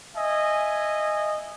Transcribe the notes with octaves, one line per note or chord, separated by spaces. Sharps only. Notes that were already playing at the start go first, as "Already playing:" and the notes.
D#5 E5 G#5